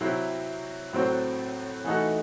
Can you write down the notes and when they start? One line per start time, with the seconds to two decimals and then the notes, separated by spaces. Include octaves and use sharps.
0.01 C3 F#3 C4 E4
0.93 A2 F#3 C4 F#4 C5
1.84 E3 A3 D#4 F#4 A4